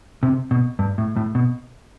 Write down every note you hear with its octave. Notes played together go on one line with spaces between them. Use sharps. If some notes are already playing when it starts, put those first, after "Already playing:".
C3
B2
G2
A2
A2
B2